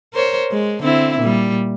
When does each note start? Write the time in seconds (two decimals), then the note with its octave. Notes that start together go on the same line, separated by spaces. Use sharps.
0.13 A#4 C5 C#5
0.52 G#3
0.83 D3 C4 E4
1.19 A#2 G3